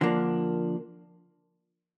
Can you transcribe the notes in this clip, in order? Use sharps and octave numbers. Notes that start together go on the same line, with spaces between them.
D3 F3 A#3 D4